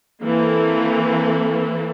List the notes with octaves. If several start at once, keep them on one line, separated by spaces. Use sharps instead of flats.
E3 A#3 C4 A4